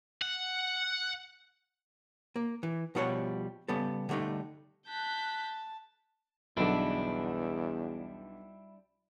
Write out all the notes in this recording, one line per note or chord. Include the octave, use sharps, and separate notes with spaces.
F#5
A#3
E3
B2 F3 G3 C#5 E5 F#5
C#3 G3 B3 A4
D3 G3 A3 D4 D#4
A5 F#6 G6 B6
B1 E2 D3 G3 D4 E4